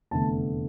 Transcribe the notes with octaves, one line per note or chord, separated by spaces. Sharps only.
F1 E2 D3 A3 A5